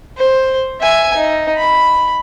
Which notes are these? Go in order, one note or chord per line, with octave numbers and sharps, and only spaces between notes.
C5
E5 G#5
D#4
B5